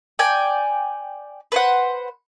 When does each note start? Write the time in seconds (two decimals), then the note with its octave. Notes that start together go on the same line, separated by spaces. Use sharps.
0.19 D5 G5 G#5
1.52 B4 C5 F#5